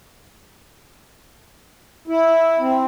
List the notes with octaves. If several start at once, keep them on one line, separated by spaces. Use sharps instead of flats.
E4
C4